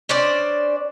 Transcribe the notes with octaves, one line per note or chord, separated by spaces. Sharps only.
C#4 D4 C5 D5